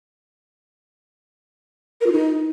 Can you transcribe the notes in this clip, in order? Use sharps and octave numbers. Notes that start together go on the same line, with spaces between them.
A#4
F4
D#4